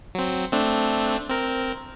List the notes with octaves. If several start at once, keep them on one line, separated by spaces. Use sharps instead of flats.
F#3 C4
A3 C4 D4
C4 A#4